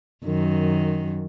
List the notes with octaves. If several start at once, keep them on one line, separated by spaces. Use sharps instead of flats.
F#2 D#3